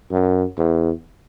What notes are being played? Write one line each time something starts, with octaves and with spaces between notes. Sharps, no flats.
F#2
E2